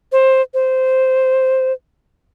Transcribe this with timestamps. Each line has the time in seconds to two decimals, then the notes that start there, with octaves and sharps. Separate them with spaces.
0.12 C5
0.54 C5